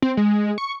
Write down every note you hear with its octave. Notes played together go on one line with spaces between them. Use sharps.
C4
G#3
C#6